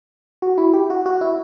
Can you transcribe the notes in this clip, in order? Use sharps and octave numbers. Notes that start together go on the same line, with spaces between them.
F#4
E4
G4
F#4
F#4
E4